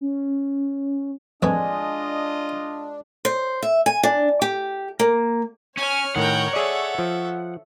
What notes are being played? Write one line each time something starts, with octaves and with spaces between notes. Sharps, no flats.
C#4
A1 F2 G#3 D4 F4 B4 D#5
C5
E5
G#5
D4
G4
A#3
C#4 C#5 G#5 F6
A2 D#3 A#4 F#5 G5
G#4 A4 D5 E5
F3